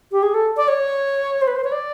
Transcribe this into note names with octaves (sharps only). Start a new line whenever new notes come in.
G4
G#4
A4
D5
C#5
C5
B4
C5
C#5
D5